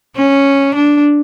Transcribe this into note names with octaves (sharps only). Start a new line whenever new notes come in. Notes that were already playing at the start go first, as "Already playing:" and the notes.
C#4
D4